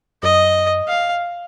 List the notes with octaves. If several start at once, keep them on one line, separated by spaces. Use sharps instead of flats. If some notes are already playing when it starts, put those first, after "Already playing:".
F#2 D#5
F5